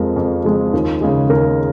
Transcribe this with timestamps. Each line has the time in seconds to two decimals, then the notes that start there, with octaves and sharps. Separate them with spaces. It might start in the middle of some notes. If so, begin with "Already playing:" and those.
Already playing: F2 F3 G#3 A#4
0.16 F2
0.45 F3 G#3
0.73 D#2 F4
1.01 C#3 G#3 G#4
1.29 D#2 A#4